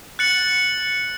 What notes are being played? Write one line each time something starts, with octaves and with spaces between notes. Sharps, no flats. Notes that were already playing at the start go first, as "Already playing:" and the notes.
F#6 A6 C#7 F#7